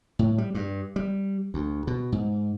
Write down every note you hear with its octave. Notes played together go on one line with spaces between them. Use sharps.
A2
G3
G2
G3
D2
B2
G#2